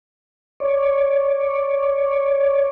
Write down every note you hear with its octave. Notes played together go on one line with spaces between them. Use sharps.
C#5 D5